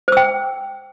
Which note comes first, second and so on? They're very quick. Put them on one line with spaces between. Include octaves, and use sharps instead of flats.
C5 E6 G5